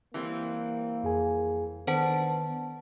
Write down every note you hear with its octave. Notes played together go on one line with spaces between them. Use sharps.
E3 G3 A#3 C4
F2 G#4 G#5
D#3 B3 D4 A4 C5 F#5 A5